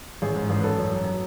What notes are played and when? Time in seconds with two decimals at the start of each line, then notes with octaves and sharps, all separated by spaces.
0.22 A1 G#4
0.36 G#2
0.50 A1
0.60 B4
0.63 F#2 A4
0.79 F#2
0.92 F#3
1.06 F#3